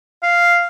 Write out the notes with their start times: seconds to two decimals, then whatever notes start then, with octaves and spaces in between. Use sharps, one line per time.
0.23 F5